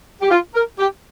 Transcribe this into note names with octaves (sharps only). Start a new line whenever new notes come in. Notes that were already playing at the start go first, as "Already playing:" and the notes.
G4
F4
A#4
G4